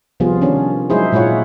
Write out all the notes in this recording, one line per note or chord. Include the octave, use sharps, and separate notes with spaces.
C3 F3 G3 B3 F4 G#4
D#3 C#4 D4
F#3 G#3 D#4 E4 G#4 C5
A#2 G#3 E4 F4 C#5 F#5